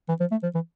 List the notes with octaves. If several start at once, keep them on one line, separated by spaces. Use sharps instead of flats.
E3
F3
A3
F3
E3